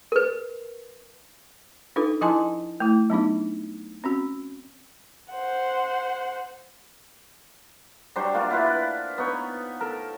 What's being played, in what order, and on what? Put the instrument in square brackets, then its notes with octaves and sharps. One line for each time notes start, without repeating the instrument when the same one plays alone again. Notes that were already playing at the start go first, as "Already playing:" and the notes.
[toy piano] A#4 B4
[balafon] D4 D#4 F4 A4 B4
F3 E4 D#5 G#5 A5 C6
A3 E4
F#3 B3 D4 D#4
C4 C#4 F#4
[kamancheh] C5 F#5
[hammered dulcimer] F#3 G3 D4 C5
A#3 D4 F4 F#4
E4 F4 B4
B4
B3 D#4 C#5
A4 A#4